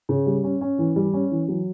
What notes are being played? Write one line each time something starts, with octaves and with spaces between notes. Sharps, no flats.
C#3
G3
C#4
C#4
E3
G3
C#4
E3
F#3